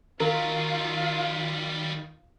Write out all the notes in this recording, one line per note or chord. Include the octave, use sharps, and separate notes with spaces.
D#3 F#3 G3 F4 A#4